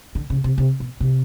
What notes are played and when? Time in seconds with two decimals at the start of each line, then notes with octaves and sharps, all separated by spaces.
0.15 D3
0.30 C#3
0.44 C3
0.58 C3
0.80 B2
1.00 C3